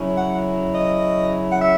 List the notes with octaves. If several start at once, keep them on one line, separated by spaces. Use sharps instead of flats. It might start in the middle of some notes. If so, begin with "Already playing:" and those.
Already playing: C#3 F#3 C#4 E4
F#5
D#5
F#5
E5